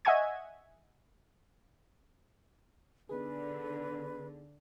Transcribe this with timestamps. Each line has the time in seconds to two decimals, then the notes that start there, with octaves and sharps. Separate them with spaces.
0.05 D#5 E5 F#5 G#5 C#6 G#6
3.09 D3 B3 D#4 G#4 B4